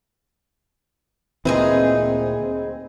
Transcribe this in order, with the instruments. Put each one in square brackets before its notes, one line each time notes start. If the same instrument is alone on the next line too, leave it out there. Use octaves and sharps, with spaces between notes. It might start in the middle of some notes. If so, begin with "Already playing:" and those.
[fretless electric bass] D2 A#2 E3 [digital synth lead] C4 [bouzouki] D#4 G#4 B4